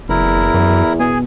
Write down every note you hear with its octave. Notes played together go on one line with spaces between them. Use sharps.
F#1 E2 E4 A#4
F#2
B2 G#4 G#5